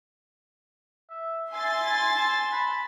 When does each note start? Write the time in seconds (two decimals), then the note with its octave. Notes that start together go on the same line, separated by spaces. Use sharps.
1.10 E5
1.53 E5 G#5 C6 A6
1.82 E4
2.16 A5
2.53 B5